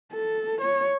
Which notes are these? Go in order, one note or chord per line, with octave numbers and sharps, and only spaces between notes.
A4
C#5